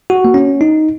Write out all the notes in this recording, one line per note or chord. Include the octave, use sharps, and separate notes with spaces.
F#4
A#3
C#4
D#4